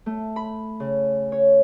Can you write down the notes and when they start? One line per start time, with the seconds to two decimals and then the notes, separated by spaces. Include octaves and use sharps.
0.06 A3
0.36 B5
0.80 C#3
1.32 C#5